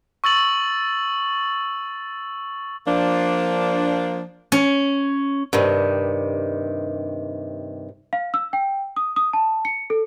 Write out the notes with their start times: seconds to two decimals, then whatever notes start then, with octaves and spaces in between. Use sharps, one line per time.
0.24 C#6 E6 A6 F#7
2.86 F3 A#3 D4
4.52 C#4
5.53 G2 C3 D#3
8.13 F5
8.34 E6
8.53 G5
8.96 D#6
9.16 D#6
9.33 A5
9.65 C#7
9.90 A4